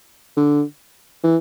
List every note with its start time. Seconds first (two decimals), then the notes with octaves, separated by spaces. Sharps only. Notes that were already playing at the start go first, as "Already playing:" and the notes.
0.37 D3
1.24 E3